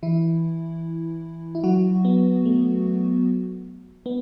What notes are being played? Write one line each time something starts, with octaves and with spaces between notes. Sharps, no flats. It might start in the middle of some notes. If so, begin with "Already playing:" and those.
E3 E4
E4
F#3 F#4
B3
A3
B3